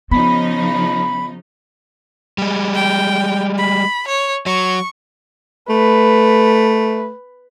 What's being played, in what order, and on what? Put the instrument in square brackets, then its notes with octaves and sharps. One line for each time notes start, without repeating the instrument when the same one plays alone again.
[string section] C#3 F3 D#4 [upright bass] B3 [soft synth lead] B5
[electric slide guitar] G3 G#3
[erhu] G5
B5
C#5
[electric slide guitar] F#3 [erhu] C#6
[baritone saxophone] A3 [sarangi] B4